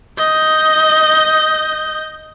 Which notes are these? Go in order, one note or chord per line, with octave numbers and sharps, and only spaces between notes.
D#5 G6